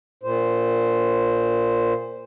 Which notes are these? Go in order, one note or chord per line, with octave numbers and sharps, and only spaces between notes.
A#2 C5